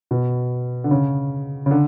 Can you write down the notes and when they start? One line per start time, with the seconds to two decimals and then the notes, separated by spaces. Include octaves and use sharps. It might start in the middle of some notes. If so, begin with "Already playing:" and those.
0.11 B2
0.84 D3
0.91 C#3
1.66 C#3
1.71 D3